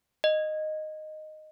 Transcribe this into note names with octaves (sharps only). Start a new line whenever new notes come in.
D#5